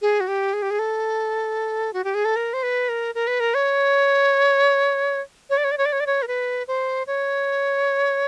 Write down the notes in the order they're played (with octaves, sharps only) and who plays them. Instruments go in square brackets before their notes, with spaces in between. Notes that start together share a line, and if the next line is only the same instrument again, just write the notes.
[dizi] G#4
F#4
G4
G#4
G4
G#4
A4
F#4
G4
G#4
A4
A#4
C5
B4
A#4
A#4
B4
A#4
C#5
C#5
D5
C#5
D5
C#5
D5
C#5
D5
C#5
A#4
B4
C5
C#5